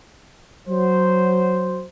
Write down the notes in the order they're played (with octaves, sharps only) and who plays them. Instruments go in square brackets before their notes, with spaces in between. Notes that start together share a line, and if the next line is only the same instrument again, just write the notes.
[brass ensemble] F#3 C5